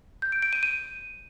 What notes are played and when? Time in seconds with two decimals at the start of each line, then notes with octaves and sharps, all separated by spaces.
0.22 G6
0.32 D7
0.42 D7
0.53 D#7
0.63 D#7